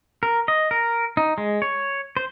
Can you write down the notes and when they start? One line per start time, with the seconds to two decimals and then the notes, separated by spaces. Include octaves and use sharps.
0.23 A#4
0.48 D#5
0.71 A#4
1.17 D#4
1.38 G#3
1.62 C#5
2.17 C5